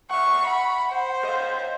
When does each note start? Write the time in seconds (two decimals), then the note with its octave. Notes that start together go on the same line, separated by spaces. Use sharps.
0.11 E5 F#5 C#6
0.47 F#5 B5
0.91 C5
1.24 D#5 F5